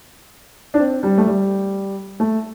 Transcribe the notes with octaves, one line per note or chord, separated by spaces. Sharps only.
D4
C4
G3
A3
G3
A3